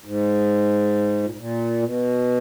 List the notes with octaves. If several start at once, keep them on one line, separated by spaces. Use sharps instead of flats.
G#2
A#2
G#2
A#2
B2